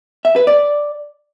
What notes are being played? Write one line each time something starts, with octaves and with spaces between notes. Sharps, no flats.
E5
B4
D5